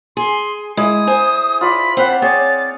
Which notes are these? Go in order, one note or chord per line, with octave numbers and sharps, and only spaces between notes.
G#4 C6
G#3 E4 G#4 D#6
C5 G#5
F4 D5 B5
C4 C5 F5 F#5
C4 G#4 C#5 D5 A6